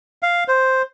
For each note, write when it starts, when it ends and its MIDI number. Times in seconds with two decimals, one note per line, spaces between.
0.23 0.44 77
0.48 0.82 72